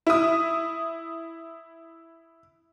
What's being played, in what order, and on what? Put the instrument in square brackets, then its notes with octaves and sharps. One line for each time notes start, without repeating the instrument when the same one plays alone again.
[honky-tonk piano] E4 D#6